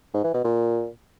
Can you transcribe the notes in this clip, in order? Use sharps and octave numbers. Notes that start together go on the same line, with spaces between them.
G#2
E3
B2
A#2